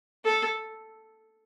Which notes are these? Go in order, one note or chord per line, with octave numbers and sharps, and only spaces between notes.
A4